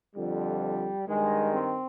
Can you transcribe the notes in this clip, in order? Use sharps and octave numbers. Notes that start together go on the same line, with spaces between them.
F2 D3 F3 G3
G2 D#3 G#3
C4